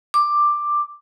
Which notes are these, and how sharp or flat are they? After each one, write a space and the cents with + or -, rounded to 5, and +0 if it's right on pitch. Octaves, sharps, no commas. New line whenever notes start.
D6 +10